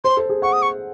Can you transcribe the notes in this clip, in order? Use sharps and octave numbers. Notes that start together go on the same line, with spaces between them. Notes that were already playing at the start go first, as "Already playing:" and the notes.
C5 C6
A4
G#4
F#5 C#6
D#6
C#6